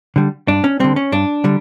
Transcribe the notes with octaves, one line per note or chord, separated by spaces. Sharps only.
D3 G3
G2 D4
C#4
D3 G3 C4
C#4
G2 D4
D3 G3